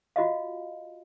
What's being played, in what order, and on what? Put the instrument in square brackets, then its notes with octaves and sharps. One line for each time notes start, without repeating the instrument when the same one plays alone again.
[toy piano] F4 F#4 D#5 F5